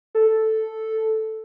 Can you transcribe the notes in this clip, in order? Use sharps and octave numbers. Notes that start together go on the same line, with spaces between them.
A4